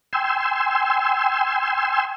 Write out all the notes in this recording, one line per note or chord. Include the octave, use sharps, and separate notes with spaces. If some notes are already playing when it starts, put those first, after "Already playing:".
G5 G#5 C6 E6